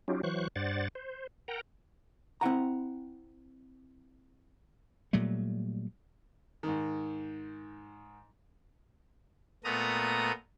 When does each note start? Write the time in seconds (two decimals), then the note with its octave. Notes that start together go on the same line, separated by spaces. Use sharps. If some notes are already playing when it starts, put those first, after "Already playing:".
0.08 F#3 C#4 D#4 F4 G4
0.23 E3 F#3 C5 C#6 F#6
0.56 G2 C5 D5 F#5 A6
0.95 C5
1.48 A#4 F#5 G5 A#5
2.41 C4 E4 F#5 A#5
5.13 A#2 F#3 G3 A3
6.63 G#2 D#3
9.64 A#2 A3 B3 A#5 D#6